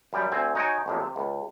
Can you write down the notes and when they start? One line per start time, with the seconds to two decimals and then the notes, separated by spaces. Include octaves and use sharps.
0.13 F#2 G3 G5
0.32 D2 C4 G#5
0.55 D#4 F#4 C#5 G5 G#5
0.86 A1 F2 A#2
1.00 C3
1.16 C#2